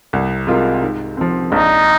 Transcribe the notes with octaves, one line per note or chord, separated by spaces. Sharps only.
C2
C3 G#3 F4 A#4
G#2
F3 C4
A#1 D#4